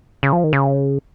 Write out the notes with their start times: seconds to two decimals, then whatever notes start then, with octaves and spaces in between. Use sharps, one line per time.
0.23 C#3
0.33 F3
0.44 D#3
0.53 C#3